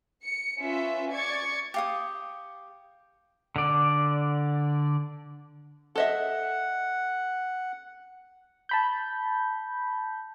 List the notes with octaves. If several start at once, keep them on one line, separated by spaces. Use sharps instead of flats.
C#7
C#4 F4 B4 E5
D5 C#6 G#6 A6 C#7
G4 F5 D#6
D3 D5
A4 D#5 E5 F#5
A5 B5 G6